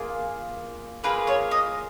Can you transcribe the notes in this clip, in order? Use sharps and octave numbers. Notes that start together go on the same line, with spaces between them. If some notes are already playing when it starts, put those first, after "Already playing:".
Already playing: A#3 F4 G#4
A#3 F4 G#4 B4
C#5
D#5